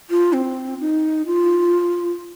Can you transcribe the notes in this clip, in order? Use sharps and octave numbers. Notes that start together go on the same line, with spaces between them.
F4
C4
D#4
F4